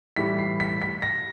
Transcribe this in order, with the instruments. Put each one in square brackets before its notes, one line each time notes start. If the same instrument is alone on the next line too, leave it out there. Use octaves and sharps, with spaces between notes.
[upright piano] A2 E3 G3 B6
C7
B6
B6
A#6